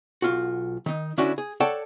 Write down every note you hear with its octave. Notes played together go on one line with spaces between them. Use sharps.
B1 F4 F#4
D#3 D#4
D3 C#4 D4 E4 F#4
G#4
A4 C#5 D5 F#5 G5 A5